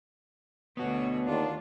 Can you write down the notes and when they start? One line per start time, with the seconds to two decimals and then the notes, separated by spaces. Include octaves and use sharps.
0.77 D2 B3 F#4 C#5
1.27 D#2 D4 F4